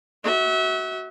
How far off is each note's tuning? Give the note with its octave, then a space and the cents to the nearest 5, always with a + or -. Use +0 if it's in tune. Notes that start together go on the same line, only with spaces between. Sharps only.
F#4 +15 E5 -30